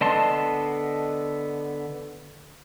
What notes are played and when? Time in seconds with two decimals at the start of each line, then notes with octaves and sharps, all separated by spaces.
0.01 D3 B3 D#5 A5 C6